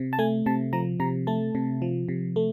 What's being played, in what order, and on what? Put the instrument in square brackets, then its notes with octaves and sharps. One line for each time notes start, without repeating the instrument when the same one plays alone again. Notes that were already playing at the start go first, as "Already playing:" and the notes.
Already playing: [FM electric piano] C3
A5
A3 G#5
C3 A5
F3 A#5
C3 A#5
A3 A5
C3
F3
C3
A3